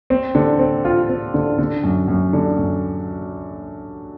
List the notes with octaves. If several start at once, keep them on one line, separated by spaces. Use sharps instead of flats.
C4
D3
C4
F4
C4
D3
D3
F#2
F#2
D3
F#2